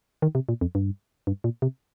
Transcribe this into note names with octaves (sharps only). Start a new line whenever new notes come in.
D#3
C3
A#2
F2
G2
G2
A#2
C3